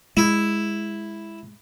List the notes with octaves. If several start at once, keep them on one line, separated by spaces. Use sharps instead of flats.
G#3 E4